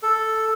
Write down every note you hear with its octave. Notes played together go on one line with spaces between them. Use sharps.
A4